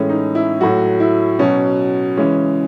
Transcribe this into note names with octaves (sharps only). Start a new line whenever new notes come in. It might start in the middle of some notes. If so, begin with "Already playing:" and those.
Already playing: A2 E3 G#3 C#4
D#4
E4
A2 F#3 F#4
E4
B2 F#3 C#4
C#3 E3 G#3 C#4